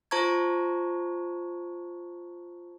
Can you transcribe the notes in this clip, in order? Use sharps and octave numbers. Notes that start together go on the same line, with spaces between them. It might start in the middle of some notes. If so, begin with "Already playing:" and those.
F4 C5 A5 A#5 C#6 G#6